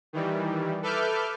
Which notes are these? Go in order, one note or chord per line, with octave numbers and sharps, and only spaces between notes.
D#3 E3 G3
A4 B4 E5 D6 F6 G6